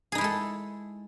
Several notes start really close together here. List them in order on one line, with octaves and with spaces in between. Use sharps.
G#4 D#4 E4 G#3 A4